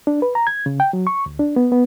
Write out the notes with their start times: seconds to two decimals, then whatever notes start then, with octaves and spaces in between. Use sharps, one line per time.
0.07 D4
0.22 B4
0.35 A#5
0.47 G#6
0.66 C#3
0.80 G5
0.93 F#3
1.07 C#6
1.26 D2
1.39 D4
1.56 B3
1.72 B3